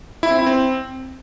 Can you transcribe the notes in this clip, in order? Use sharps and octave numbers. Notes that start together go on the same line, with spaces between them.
E4
C4
E4
C4